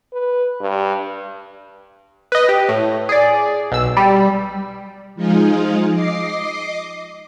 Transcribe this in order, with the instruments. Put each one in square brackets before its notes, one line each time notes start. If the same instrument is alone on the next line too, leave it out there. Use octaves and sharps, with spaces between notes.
[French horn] B4
G2
[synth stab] B4 D#5
G4
A2
G#4 D5
B1 E6
G3
[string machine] F3 G#3 D#4 F4 G#4
D#5 D6 C7